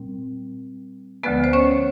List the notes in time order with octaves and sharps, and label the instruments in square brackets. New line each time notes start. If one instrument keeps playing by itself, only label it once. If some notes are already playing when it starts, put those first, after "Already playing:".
Already playing: [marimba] A#2 G3 C4
D2 D3 F3 G#3 B3 B4
C5
C#4 C#5